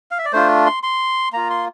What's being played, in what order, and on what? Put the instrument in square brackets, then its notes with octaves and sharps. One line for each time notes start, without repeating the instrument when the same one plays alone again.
[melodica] F5
E5
D5
A3 D4 F4 C5
C6
C6
A#3 F4 A#5
C6